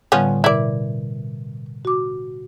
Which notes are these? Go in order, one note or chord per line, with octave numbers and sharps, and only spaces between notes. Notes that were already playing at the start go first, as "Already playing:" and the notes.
A2 D3 F3 G3 B3 C#4
B2 E4 A#4 D5
F#4 D6